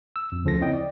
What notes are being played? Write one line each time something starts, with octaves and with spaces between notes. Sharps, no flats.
E6
F2
D2 C#3 F3 C#4 A4 A#6
C4 E4 C#5 D#5 G5
D5